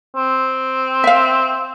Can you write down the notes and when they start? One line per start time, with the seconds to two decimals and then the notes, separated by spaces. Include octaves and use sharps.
0.16 C4
1.04 E5 F5